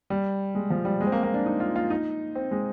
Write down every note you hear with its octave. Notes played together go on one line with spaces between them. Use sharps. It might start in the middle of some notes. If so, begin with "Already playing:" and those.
G3
G#3
F3
G3
G#3
C4
A#3
A#3
D4
D#4
F4
F4
D#4
C4
G#3